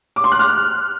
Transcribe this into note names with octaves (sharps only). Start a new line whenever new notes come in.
D6
C6
F#6
F6